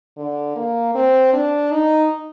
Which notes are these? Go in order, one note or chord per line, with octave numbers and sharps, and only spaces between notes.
D3
A#3
C4
D4
D#4